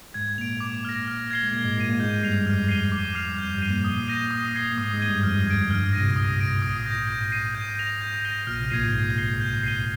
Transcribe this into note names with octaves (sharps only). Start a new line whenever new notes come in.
G#2 G#3 G#6
A#2 A#3 D7 F7
D6
F6 A#6
F6
G#6 C7 G7
G#3
A#2 A#3 G#6
G#2 G#3
A#2 A#3 C7 D#7
A#2 A#3
G#2 G#3 G6
G2 G3 C7 F7
F2 F3 F6
C7 D#7 G7
D6
F6 C7 F7
G3
F2 F3 G6
G2 G3
C7 D#7 G7
A#2 A#3
A#2 A#3 D#6
G6 A#6 D#7 G7
D#6
G#6 C7 G7
A#3
G#2 G#3 D#6
G#2 G#3
G#6 D#7 G7
G2 G3
F2 F3 F6
D2 D3 G#6 D7
G2 F6
G#2
A#2 A#6 D#7
C2 C3
D#6
A#6 D7
A#1 A#2 D#6
G#2
G6 A#6
A#1 A#2
G#2 G6
C7 D#7
G6
A#6 F7
G6
A#6 D#7 G7
A#1 A#2 F6
C2 C3
A#1 A#2 G#6 C7 D#7
G#2
G#2 G#6
C7 G7
G6
C7 D#7 G7